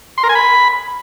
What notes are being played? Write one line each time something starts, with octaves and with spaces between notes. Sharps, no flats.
C6
A#4
G#5
B5